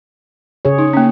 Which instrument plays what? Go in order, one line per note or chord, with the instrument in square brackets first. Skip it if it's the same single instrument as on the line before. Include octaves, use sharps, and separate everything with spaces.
[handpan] C#3 G#4 C#5
[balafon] D#4
A#3 C#4